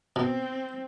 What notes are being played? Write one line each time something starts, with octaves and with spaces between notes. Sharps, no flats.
B2 C4